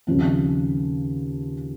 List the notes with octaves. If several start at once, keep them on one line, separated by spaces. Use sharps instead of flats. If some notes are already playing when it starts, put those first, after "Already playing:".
D#2 C#3 F3 C4